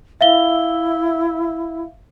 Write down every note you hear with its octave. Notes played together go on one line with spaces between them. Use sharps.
E4 E5 F5 G7